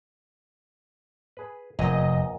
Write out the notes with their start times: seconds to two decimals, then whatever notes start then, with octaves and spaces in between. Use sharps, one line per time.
1.37 G#4 B4
1.79 F1 A#1 E2 A#2 D#5